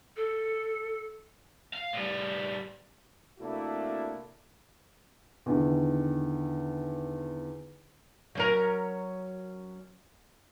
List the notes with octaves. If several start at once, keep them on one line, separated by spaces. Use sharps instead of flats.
A4
F5
A2 G3
C3 A3 A#3 D4 E4 F#4
E2 D3 D#3
F#3 C#4 A#4